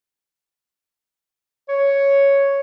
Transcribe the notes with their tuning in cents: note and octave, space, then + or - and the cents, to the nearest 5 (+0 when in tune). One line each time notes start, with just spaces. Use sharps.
C#5 +0